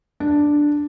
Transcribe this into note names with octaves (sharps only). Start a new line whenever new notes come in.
D4